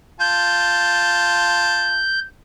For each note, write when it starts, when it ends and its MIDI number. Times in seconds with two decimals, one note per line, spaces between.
0.20 2.05 65
0.20 2.05 81
0.20 2.20 91